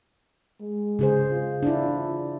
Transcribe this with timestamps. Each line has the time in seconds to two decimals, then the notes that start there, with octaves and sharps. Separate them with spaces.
0.61 G#3
0.99 C#3 G#4 C5
1.32 F4
1.63 D4 E4